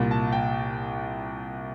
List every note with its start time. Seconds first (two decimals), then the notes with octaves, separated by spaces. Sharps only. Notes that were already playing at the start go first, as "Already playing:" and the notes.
Already playing: C2 A#2
0.11 A5
0.33 G5